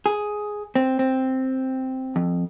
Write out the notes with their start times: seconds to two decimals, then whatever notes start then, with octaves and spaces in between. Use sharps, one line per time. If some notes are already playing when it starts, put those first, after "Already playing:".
0.06 G#4
0.75 C4
0.99 C4
2.16 F2